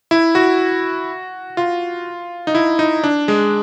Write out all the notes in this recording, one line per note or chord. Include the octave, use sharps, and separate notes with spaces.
E4
F#4
F4
D#4
E4
D#4
D4
G#3